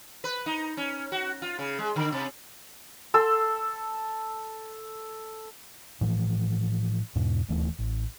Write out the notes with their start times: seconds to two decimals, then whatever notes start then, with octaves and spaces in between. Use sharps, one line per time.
0.24 B4
0.46 D#4
0.77 C#4
1.12 F#4
1.42 F4
1.59 C#3
1.79 G#3
1.96 D3
2.12 C3
3.14 A4 C6 E6
6.01 A2 E3 F3
7.15 E2 G#2 B2
7.48 D1 D#2 E3 A3
7.79 A1